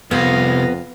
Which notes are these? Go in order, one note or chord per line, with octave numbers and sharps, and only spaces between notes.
C2 F2 B3 F5 A#6